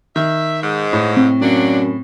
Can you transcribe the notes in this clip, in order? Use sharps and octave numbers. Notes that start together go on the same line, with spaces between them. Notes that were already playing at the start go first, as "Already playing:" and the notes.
D#3 E5
G#2
A2
C4
F#2 F#3 A#3 D4